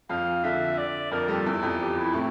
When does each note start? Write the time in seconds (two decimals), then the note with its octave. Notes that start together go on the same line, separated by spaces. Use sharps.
0.09 F2 F3 F5
0.44 D3 E5
0.78 D5
1.11 F2 F3 A#4
1.28 G2 G3 A4
1.46 E2 E3
1.62 F2 F3
1.80 G4
1.97 E4
2.13 A2 A3 C4